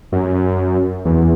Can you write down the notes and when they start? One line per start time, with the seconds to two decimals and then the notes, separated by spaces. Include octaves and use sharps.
0.12 F#2
1.05 E2